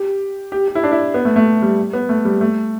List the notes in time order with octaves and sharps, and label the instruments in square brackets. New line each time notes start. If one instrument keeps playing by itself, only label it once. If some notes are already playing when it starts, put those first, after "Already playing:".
Already playing: [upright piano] G4
G4
G4
E4
D4
E4
B3
A3
A3
G3
B3
A3
G3
A3